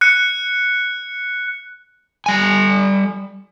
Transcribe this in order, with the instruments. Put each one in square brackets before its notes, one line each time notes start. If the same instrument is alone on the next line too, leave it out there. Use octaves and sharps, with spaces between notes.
[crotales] F#6 C#7
[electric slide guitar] G3 G#5